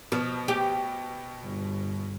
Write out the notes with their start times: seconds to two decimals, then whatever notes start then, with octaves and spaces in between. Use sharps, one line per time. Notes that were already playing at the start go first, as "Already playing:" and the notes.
0.12 B2 F3
0.48 G4
1.42 G1